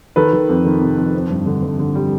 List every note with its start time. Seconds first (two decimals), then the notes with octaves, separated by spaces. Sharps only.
0.16 D#3 A4 B4
0.33 D#3
0.49 F2
0.65 D#3
0.81 C3
0.98 F2
1.14 C4
1.30 G2
1.46 D3
1.62 G2
1.79 D3
1.95 G3